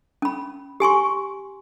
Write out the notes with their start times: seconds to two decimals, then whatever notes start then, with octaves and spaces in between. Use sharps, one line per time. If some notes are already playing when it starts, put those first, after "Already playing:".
0.22 C#4 B5
0.80 G4 G#5 C6 C#6